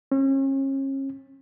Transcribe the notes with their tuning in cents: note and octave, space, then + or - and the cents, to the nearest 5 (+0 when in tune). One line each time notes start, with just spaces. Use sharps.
C#4 -40